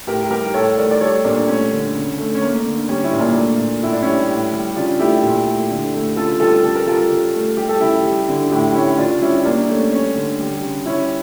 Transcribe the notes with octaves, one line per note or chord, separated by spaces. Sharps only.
A2 G4 A#4
G3 G4 A#4
A2 A4 C#5
A3 A#4 D5
D5
G3 A4 C#5
A#2 A#3 D4
A3 C#4
D3
C#3
A3
C#4
A3 A#3
D3
G3 C#4
C#4 E4
A#2
A#3 D4
A3
A#2
A2 E4
D4
G3 C#4 E4
A2
G3
C#3 D4 F4
A3 E4 G4
A#2
A3
D3
A3
C#3 F4 A4
G3 F4 A4
C#3 A4
A#4
G3 F4 A4
C#3
A3
G3 G4
A4
C#3 E4 G4
G3
D3
A2 E4 G4
A3 C#4 E4
C#3 D4 F4
D4
G3 C#4 E4
C#3 A#3 D4
A3 C#4
G3 C#4
D3
G3
C#3
G3 C#4 E4